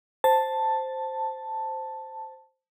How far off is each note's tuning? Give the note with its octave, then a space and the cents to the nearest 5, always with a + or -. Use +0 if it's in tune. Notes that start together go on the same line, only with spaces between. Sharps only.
C5 +0 A5 +5